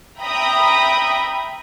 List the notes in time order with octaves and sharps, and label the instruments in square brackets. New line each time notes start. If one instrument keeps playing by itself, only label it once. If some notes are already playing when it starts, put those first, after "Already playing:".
[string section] E5 G5 A#5 B5 D#6